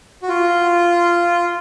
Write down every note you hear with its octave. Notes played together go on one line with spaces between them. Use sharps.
F#4
F4